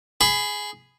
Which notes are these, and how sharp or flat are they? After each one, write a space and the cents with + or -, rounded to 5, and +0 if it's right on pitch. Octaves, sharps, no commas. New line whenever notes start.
G#4 +0 B5 +20